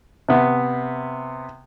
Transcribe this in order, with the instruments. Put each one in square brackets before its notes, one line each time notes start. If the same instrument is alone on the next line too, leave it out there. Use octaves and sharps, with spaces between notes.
[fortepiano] C3 B3